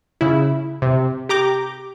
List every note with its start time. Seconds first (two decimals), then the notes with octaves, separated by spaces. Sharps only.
0.21 C#3 E4
0.82 C3
1.29 G4 A#5 D6 G6